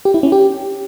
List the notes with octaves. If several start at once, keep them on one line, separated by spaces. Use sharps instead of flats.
G4
E4
C#4
G4